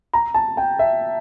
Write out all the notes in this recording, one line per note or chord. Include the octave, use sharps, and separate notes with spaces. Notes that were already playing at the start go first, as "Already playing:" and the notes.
A#5
A5
G5
E5